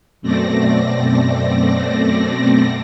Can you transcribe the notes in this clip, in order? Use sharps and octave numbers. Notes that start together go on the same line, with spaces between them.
F#2 B2 A3 C4 D5 A#6